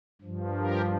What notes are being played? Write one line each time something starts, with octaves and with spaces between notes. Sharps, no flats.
G2 F3
G4 A#4